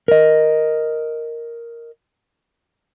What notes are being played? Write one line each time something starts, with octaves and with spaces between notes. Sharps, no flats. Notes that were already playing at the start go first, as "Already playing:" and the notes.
A#4 D#5